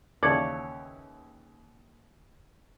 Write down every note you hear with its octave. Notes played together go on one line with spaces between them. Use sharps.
D#2 C#3 E3 C#5 D5 F5 A5